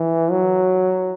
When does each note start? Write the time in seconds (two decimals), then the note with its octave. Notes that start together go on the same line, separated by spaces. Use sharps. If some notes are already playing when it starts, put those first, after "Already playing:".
Already playing: E3
0.31 F#3